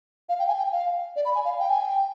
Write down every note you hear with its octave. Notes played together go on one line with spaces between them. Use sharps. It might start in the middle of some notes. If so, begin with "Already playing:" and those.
F5
G5
G#5
G5
F5
D5
B5
G#5
F5
G5
G#5
G5